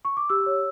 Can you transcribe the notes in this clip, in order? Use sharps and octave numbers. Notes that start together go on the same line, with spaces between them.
C#6
D6
G4 E6
C#5